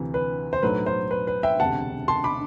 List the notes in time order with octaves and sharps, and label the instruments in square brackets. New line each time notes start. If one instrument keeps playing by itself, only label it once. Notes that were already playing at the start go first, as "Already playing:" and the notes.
Already playing: [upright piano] D2 C3 E3
B4
C5
B1 A2 F#3 A3 B4
C5
B4
B4
E5 G5
E1 D2 C3 F#5 A5
A5 C6
B5 D6